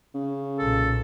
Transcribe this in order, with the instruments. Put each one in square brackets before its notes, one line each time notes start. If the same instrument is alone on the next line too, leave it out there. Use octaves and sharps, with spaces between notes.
[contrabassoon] C#3
[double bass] B1 A#2 [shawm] A4